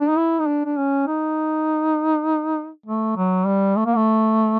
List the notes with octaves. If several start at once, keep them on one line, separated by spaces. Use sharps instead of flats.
D4
D#4
E4
D#4
D4
D4
C#4
D#4
A3
F#3
G3
A3
A#3
A3